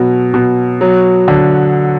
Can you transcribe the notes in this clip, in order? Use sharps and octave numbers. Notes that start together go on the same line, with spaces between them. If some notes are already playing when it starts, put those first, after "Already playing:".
Already playing: B2 F#3
B2
F#3
D3